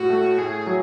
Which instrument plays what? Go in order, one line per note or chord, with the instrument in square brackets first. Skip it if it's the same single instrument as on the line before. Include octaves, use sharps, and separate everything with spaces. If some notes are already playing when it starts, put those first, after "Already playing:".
Already playing: [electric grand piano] A2 [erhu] F#4
[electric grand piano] A3
[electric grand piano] A2 [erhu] G#4
[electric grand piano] F#3